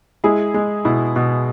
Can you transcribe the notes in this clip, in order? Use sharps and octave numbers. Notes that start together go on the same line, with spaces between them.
G#3 E4 G#4
G#3
B2 E4
B2